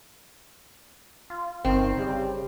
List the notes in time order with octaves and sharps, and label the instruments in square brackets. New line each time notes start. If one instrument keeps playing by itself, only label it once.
[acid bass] F4
[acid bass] G1 [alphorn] D#3 [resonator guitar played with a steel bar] C4
[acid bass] C#3 [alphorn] G3